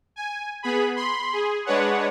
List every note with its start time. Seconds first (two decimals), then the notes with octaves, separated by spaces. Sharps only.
0.16 G#5
0.63 B3 G#4 B5
0.96 B5 C6
1.33 G#4
1.66 G#3 D4 B4 C#5 F#5